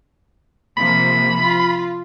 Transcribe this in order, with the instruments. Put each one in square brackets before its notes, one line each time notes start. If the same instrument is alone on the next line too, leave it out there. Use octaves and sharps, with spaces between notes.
[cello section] C3 F3 A#3 [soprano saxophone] B5
[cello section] F4